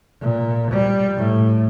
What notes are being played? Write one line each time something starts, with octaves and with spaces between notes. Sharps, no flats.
A#2
G3
A2